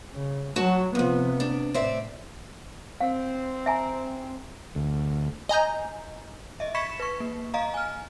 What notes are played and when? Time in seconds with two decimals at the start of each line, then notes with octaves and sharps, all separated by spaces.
0.14 C#3
0.56 F#3 F#4 A5
0.95 E2 C3 F3 B3
1.40 D4
1.74 A2 C4 D5 E5
3.00 C4 F5
3.66 E5 G#5 A#5
4.75 D2
5.49 D#5 G#5 A#5 G6
6.60 D#5 E5
6.75 B5 C#6 G#6 B6 C#7 E7
7.00 B4 C#6
7.20 A#3
7.54 D#5 F5 A#5
7.74 G#5 F6